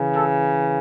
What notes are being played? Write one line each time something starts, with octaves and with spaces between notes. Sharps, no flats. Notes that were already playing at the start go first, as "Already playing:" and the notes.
Already playing: C#3 E3
A4